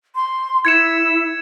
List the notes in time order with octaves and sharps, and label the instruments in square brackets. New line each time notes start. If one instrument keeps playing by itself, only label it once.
[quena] C6
[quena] E4 [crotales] G#6 C#7 E7